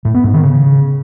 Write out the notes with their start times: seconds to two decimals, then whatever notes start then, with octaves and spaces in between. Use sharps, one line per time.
0.05 A2
0.14 B3
0.24 G#2
0.34 D#3
0.43 C#3